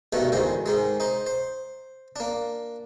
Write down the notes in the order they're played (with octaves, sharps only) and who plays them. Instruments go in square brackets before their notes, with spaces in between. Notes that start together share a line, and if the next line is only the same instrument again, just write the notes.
[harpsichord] G2 B2 D#3 A3
A1 D2 D#3 G#3 C5
G#2 D#3 G#3
D#4 C5
C5
A#3 D4